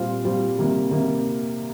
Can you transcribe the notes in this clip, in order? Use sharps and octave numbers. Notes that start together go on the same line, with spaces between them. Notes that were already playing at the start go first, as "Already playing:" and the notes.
Already playing: A#2 G3 C4 F4
A#2 G3 C4 F4
C3 D#3 G3 A#3
C3 D#3 G3 A#3